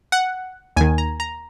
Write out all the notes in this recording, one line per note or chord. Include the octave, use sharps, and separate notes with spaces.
F#5
D#2 D#3 G#5
A#5
A#5